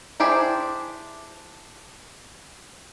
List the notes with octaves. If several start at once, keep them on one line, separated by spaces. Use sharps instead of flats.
D4 E4 G4 G#4 C5